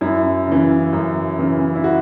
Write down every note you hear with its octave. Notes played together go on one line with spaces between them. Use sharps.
F#2 E4
C#3 E3
F#2
C#3 E3
E4
F#4